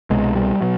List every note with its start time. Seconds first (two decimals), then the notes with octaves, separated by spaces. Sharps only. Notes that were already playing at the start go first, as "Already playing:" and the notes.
0.10 C2 B2 G#3
0.35 G3
0.61 B2 F#3